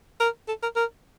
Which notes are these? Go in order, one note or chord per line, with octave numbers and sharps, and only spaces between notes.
A#4
A4
A#4
A#4